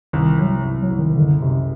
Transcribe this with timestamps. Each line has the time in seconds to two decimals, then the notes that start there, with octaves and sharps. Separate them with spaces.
0.13 C2 D#3
0.39 C2 F#3
0.64 C2
0.83 F#3
0.91 C2
0.99 D#3
1.16 F#1 D3
1.42 F#2 C3